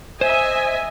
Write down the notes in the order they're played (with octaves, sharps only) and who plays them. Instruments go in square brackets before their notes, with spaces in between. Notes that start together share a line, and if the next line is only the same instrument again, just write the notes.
[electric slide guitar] C5 [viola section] D#5 E5 G#5